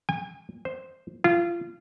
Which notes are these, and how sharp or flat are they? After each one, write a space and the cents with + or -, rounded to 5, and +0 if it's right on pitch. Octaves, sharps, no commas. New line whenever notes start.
G#5 -40
C5 +0
F4 -25